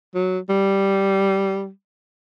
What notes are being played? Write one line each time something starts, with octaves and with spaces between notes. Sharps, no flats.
F#3
G3